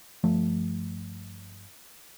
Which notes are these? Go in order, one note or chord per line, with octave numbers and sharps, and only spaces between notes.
G1 F3 A3